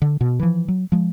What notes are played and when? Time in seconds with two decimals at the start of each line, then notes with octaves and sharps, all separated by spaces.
0.02 D3
0.21 B2
0.40 E3 F3
0.68 F#3
0.92 F3 G#3